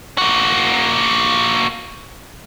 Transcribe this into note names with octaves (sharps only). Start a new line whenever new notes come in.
A#3 F#4